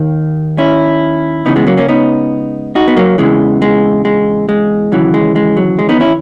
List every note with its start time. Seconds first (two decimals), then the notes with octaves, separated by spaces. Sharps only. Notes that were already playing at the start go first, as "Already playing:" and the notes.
Already playing: D#2 D#3
0.58 C#4 E4
1.45 C#2 C#3 E3 B3 D#4
1.56 G#3 B3
1.67 F#3 A#3
1.77 A#3 C#4
1.88 B3 D#4
2.75 D#4 F#4
2.88 B3
2.97 F#3 A#3
3.18 E2 C#3 E3 G#3
3.62 G#3
4.05 G#3
4.49 G#3
4.92 D#2 C#3 E3 F#3
5.14 G#3
5.36 G#3
5.57 F#3
5.79 G#3
5.89 B3 D#4
6.00 C#4 E4